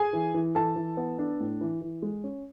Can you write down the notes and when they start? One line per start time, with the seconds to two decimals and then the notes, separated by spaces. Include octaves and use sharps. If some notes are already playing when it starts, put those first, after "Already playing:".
Already playing: G#4 G#5
0.13 E3
0.34 E3
0.55 E3 A4 A5
0.76 E3
0.97 B3
1.19 D4
1.40 A2
1.61 E3
1.81 E3
2.02 G#3
2.24 C#4